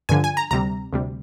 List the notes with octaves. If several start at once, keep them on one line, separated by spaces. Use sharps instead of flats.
G2 D3 F3 G#5
G#5
A#5
D2 C3 G3 A#5
D2 C3 G3